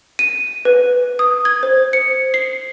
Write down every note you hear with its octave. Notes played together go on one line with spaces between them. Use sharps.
D#7
B4
D#6
G#6
C5
C#7
C7